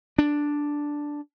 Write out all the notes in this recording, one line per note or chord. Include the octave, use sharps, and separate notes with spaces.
D4